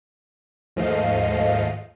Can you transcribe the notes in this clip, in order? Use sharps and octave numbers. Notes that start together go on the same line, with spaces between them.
D#2 G#2 F3 A3 D#5 F5